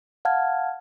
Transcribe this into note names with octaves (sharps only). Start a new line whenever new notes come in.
F5 F#5 A5 F6 G#6